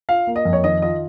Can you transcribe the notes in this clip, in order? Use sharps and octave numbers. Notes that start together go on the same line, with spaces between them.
F4 F5
A#3
D#5
F2
C#5
D#3 D#5
F4 D#5